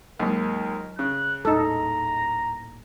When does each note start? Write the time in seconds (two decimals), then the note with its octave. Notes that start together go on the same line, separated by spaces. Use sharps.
0.19 D#2 G#2 F#3 F4 A#4
0.99 C#3 F#6
1.45 D#1 A2 D#4 A4 A#5